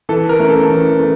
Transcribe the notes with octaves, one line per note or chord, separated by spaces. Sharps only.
E3 A4
A#4
A3 C#4
A4
E3
A3